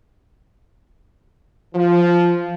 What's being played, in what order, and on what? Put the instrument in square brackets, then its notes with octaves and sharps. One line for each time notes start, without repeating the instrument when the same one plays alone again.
[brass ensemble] F3